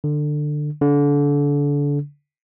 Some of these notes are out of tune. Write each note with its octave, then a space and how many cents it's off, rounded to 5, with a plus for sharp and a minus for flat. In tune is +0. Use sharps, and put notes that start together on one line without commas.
D3 +20
D3 -30